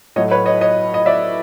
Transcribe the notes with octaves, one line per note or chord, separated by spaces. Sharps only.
A2 F#3 A3 C#5 D#5
B4 C#5
C#5 D#5
C#5 D#5
D#5
D5 E5